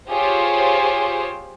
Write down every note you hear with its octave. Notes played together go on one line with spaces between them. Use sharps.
F4 G4 G#4 C5 C#5